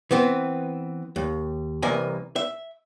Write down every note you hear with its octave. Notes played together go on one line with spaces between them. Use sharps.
E3 B3 C4
D#2
C2 E3 A#3 D#5 E5 G#5
E5